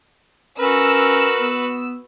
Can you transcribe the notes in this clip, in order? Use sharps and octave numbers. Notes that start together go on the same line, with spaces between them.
C#4 F#4 A#4 B4 E6
B3